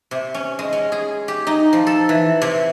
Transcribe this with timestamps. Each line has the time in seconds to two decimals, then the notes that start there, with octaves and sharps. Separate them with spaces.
0.11 C3
0.34 C#4
0.59 G#3
0.73 C#4
0.92 G#4
1.28 G4
1.47 D#4
1.73 F3
1.87 A4
2.09 E3
2.42 C3